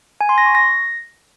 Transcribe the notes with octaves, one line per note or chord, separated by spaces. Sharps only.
G#5
C6
A#6
C#6
A#6